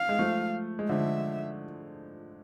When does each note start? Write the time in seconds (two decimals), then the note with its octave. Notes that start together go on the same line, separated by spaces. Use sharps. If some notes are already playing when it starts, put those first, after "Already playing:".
Already playing: F5
0.09 G#3
0.19 F3 A3
0.79 G#3
0.89 D3 F3 E5